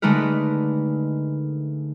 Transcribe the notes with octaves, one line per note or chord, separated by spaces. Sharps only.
D3 G#3 A3 D#4 A#4 B4